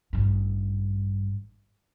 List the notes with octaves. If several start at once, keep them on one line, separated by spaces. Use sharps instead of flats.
A1 G2